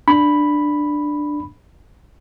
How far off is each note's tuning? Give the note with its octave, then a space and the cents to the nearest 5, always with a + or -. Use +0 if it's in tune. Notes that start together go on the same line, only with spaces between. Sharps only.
D4 +10 B5 +0